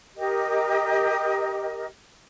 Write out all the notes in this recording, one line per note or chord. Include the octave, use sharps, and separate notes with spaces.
G4 A#4 D#5